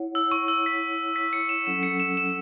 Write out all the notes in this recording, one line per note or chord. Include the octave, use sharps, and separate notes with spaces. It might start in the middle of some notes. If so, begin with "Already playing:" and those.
Already playing: E4 C#5 F#5
E6
C#6
E6
B6
B6
C#7
E7
F#3 C#4 A4 F#5 E7
C#7
E7
E7